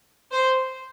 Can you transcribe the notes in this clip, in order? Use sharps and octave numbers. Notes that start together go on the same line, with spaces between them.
C5